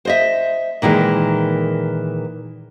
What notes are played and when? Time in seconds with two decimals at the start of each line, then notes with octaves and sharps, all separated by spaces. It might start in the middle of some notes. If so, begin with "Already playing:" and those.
0.05 C5 D#5 E5
0.82 A#2 D#3 E3 G#3